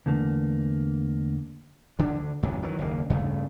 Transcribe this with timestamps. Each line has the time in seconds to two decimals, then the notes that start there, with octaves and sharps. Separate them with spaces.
0.06 E2 D3 A3 A#3
1.99 D2 D3 D4
2.43 A1 F#2 C3 F#3
2.62 D#3 E3 F#3
2.79 F#1 D#2 A#3
3.10 D2 G2 C#3 A3